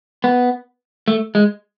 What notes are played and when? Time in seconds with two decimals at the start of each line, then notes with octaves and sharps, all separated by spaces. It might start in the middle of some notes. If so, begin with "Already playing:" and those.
0.24 B3
1.08 A3
1.35 G#3